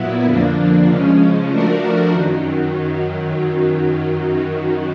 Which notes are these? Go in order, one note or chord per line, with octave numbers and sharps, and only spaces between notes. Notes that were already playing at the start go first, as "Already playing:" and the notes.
Already playing: A#2 F#3 B3 E4
F2 D3 F3 A#3 D4
C#3 F3 G#3 C#4
F3 A3 D4 F#4 A#4
F#2 D#3 F#3